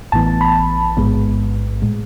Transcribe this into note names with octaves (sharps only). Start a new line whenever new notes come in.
A1 A2 E3 B3 A5
B5
A1 G#2 G#3 B3
A2 G#3